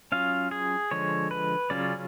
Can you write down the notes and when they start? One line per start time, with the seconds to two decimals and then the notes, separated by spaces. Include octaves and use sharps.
0.12 F#3 C#4 F4 F5
0.51 G#4
0.91 D3 F3 G#3 C#5
1.31 B4
1.70 C#3 F#3 C#4 F4 D5